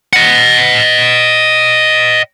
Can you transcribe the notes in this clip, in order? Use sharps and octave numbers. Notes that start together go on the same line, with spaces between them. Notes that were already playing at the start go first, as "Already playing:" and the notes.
D#5 F#5